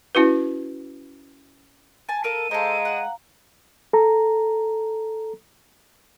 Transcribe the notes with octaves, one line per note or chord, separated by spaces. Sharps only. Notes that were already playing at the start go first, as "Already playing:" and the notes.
C#4 E4 F#4 B4
G#5 A5
A4 A#4 F5 D#7
G#3 A4 C5 F5 A#5
F#5
A4 A#5